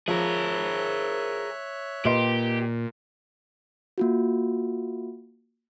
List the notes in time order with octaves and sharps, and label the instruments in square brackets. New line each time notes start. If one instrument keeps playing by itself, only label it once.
[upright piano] F3 [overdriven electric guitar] G#4 A#4 [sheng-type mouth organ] C#5 E5 F#6
[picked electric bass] A#2 [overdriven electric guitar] G4 [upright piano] B4 D#5 C6
[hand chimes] A#3 F4 F#4